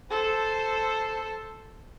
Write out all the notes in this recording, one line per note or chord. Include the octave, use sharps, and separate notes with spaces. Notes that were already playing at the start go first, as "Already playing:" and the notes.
A4 C5